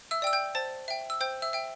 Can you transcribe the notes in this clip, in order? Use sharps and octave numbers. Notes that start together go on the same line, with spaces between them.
E5 E6
D5 G5 E6
G5 G6
C5 A5 A6
E5 G5
E6
C5 G5 G6
E5 E6
E5 G5